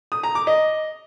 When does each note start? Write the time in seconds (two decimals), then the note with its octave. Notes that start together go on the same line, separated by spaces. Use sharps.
0.12 D#6
0.23 A#5
0.35 D6
0.47 D#5